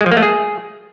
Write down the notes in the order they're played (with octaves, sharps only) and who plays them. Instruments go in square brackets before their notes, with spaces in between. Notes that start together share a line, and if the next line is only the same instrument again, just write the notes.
[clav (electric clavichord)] G#3
F3
A#3
A3
G#4